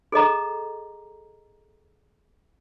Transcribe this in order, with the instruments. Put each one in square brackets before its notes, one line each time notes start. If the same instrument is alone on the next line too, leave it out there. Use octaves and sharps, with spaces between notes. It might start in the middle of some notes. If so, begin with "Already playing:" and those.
[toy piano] G#4 A4 D#5 A#5